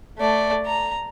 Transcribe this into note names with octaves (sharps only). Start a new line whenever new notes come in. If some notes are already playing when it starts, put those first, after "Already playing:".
A3 D5
A#5